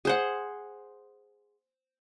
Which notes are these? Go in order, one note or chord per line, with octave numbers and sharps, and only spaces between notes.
G#4 C5 F#5